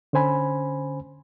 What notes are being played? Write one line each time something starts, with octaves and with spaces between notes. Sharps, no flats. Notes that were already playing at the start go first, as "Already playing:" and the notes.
D3 C#4 C5 G#5 B5